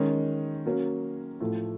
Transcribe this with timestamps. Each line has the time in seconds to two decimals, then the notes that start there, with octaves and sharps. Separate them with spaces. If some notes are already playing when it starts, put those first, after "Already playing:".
Already playing: D#3 G#3 C#4
0.66 F#3 A#3 C#4
1.40 A2 F3 A3